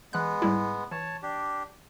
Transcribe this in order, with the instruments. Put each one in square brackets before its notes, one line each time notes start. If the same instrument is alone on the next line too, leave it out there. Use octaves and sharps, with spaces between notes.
[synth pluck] E3 F#6 [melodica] G#3 B3
[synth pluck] G#2 G3 E4
[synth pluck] E3 [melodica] C#5 A5
[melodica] D4 G4